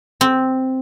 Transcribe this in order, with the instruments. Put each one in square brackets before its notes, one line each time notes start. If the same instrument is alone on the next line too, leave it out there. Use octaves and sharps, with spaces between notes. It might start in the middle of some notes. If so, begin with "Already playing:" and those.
[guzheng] C4